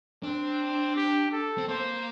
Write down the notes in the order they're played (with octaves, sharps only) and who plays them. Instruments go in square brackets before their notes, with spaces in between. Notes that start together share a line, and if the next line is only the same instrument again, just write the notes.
[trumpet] C4 [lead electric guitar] D4
[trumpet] G4
A4
[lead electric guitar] C4
[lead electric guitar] A#3 [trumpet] C5